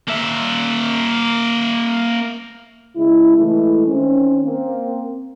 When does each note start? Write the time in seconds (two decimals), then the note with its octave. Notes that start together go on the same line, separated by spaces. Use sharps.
0.08 A#3 E5
2.96 C#3 G#3 E4
3.36 E3 G#3 A3 E4
3.86 D#3 C4 C#4
4.42 A#3 C4